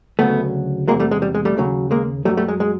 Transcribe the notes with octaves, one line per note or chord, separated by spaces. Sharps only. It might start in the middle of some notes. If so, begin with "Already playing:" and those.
D2 C#3 F#3 A3 B3
E2 C3 D#3 F#3 G#3 A#3
G3 A3
G#3
G3
G#3
G3 A3
D#2 C#3 F#3
G#3 A#3
F#2 D3 F#3 G3 A3
G3 A3
G#3
G#3